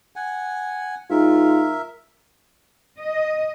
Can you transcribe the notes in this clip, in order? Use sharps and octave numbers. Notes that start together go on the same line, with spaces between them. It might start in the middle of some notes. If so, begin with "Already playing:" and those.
F#5 G#5
G#2 F4 A#4 E5
D#5